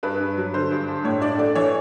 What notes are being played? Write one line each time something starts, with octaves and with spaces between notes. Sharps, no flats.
G2 B4
G2
F#3
D3 C5
G2
G2
A2 C#5
D4 D5
A3 D5
E3 C#5